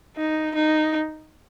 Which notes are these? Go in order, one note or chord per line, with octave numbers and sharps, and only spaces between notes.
D#4
D#4